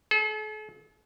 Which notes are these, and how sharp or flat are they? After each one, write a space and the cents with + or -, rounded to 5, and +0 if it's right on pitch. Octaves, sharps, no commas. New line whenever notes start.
A4 -45